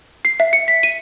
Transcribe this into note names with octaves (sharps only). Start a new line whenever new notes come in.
C7
E5
C#7
B6
D#7